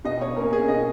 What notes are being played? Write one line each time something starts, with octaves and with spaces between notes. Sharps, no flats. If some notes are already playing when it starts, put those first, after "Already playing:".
B2 D#5
C#5
A#3 C#4 A#4
G#4
B2 D#5